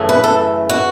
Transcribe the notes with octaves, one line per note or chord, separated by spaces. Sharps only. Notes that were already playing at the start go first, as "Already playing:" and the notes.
Already playing: F#2 C#3 E3 A3
B4
A4
F#4